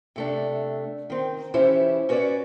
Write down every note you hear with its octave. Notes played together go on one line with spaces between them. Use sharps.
C3 A3 D4
D#3 C4
E3 C#4 E4 G4 C5 C#5
C#4 F#4 B4 C#5 D5